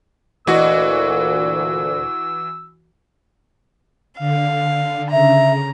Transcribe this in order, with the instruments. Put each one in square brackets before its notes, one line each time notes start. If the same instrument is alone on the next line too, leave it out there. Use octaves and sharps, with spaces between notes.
[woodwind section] D2 A#2 [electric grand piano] E3 F#4 [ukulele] D#5 [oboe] E6
[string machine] D3 [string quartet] F5
[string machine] C#3 [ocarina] E5 [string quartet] A#5